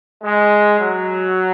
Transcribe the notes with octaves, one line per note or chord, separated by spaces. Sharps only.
G#3
F#3